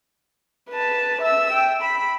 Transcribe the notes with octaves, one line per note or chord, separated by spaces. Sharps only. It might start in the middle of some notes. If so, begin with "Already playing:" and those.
B4 A5
E5 E6
G5
B5